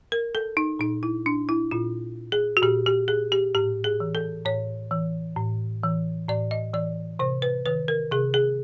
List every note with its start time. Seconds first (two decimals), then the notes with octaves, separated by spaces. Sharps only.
0.12 A#4
0.35 A4
0.57 D#4
0.79 A#2 D#4
1.03 E4
1.26 D4
1.49 E4
1.71 A#2 F4
2.32 G#4
2.57 F#4
2.63 A#2 G4
2.86 G4
3.08 G#4
3.32 G4
3.55 A2 G4
3.84 G#4
4.00 E3
4.15 A4
4.45 A2 C#5
4.91 E3
5.37 A2
5.83 E3
6.28 A2 D5
6.51 D#5
6.74 E3 D5
7.19 C3 C5
7.42 B4
7.66 D#3 B4
7.88 A#4
8.11 C3 G#4
8.34 G#4